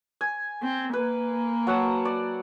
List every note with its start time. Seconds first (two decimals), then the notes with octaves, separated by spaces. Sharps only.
0.21 G#5
0.62 C4
0.93 A#3 B4
1.67 F#3 F#5 A5
2.05 D5